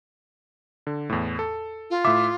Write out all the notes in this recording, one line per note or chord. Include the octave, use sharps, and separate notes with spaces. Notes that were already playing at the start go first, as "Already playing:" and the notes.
D3
E2 A2
A4
F4
A2 E5 D6